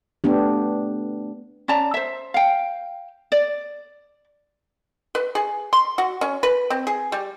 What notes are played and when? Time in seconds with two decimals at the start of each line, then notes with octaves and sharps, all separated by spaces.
0.24 A3 B3 D4 G4
1.68 C#4 D5 A5 A#5
1.94 C5 E5
2.34 F5 G5
3.32 D5
5.15 B4
5.35 G#4
5.73 C6
5.98 F#4
6.21 C#4
6.43 B4
6.70 C4
6.87 G#4
7.12 G3